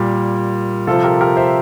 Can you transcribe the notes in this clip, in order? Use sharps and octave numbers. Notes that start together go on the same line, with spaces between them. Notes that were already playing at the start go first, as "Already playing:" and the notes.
Already playing: A#2 G3
C3 F3 F4 A4
G4 A#4
G4 A#4
C5 E5